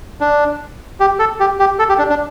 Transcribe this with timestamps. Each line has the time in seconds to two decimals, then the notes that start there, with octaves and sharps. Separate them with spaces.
0.20 D4
1.00 G4
1.19 A4
1.40 G4
1.59 G4
1.79 A4
1.89 G4
1.99 D4
2.10 D4